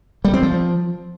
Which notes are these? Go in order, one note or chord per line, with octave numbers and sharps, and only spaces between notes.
G3
C4
F3